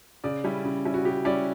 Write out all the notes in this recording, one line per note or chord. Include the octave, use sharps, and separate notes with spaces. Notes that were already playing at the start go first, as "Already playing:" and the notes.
C#3 D5
G3 C#4 E4
C#3
G3 C#4 E4
F#4
C#3 G4
G3 C#4 E4 D5